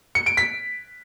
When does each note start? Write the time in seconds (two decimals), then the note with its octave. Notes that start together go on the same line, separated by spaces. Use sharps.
0.15 C#7
0.26 D7
0.37 B6